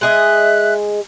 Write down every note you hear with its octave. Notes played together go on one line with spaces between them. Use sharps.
G#3 G#4 D#5 E5 F#6